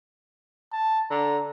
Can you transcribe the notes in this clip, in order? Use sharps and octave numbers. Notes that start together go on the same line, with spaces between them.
A5
D3 A#5